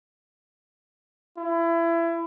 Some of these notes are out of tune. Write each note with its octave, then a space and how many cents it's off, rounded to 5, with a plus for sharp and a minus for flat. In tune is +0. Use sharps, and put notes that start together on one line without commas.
E4 +25